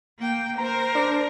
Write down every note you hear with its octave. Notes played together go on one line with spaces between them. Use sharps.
A#3 G5
A#4 C5 A#5
D4